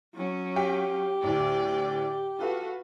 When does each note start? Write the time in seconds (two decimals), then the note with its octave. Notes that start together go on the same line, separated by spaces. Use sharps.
0.14 F#3 C#4
0.56 G4 F5 G5 B6
1.23 D2 A2 D5
2.39 F4 F#4 A4 B4 F5